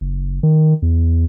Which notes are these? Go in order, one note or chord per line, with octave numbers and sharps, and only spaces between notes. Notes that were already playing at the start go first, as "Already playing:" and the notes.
F#1
D#3
E2